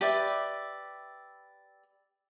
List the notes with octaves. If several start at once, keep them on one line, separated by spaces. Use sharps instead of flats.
G4 B4 D5 E5